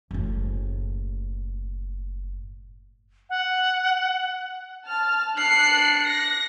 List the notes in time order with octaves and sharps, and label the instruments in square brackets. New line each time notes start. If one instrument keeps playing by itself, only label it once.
[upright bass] F#1 A2
[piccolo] F#5
[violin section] A5 F6
[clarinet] D4 [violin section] F#6 C#7 [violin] C7
[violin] A#6